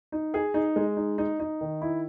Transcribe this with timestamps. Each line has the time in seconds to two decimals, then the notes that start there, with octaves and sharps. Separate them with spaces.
0.12 D#4
0.34 G#4
0.54 D#4
0.76 G#3
0.97 D#4
1.18 D#4
1.40 D#4
1.61 D#3
1.82 E4